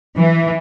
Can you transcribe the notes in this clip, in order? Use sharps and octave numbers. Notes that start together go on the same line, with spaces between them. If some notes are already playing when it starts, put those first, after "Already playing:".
E3